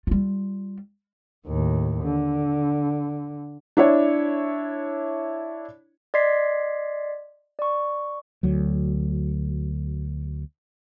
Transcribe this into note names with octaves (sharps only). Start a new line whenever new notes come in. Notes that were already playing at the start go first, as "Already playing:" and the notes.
G3 F4
D#2 A2
D3
D4 E4 C#5
D5 D#5 C6 G#6 B6 C7
D5 C#6
D2 F#3